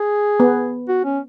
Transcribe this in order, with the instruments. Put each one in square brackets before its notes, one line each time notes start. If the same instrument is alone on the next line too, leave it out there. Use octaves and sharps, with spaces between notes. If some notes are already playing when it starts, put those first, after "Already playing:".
Already playing: [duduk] G#4
[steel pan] B3
[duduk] F#4
C#4